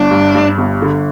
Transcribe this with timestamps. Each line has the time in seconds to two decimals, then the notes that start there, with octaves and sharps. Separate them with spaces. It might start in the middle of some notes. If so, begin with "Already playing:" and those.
Already playing: G1 D4
0.11 G2
0.35 G2
0.58 G1
0.82 D3